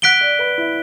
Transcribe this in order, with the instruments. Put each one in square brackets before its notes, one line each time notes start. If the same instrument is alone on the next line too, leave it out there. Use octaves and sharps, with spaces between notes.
[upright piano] F#5 [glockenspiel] F#6 B6 D7 G7
[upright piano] D5
B4
E4